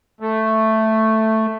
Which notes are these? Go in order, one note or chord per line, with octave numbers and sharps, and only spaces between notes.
A3